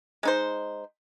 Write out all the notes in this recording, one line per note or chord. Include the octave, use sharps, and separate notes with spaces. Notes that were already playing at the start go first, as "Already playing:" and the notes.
G#3 D#4 C5